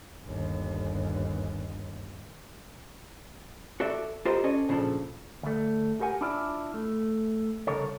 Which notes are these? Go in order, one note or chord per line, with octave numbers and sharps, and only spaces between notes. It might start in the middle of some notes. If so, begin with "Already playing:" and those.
G1 D#2
F#4 A4 D5 E5
F4 G4 A4 A#4 C5 D#5
C#4 A4 D5 D#5
A#2 C#3 F3 D4 A4
D2 A3
G4 A#4 F#5 G#5
D4 E4 F4 D5
A3
C2 G2 C#3 A4 A#4 C#5